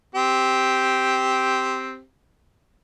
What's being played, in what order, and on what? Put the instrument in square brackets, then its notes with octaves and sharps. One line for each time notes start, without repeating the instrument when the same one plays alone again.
[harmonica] C4 G4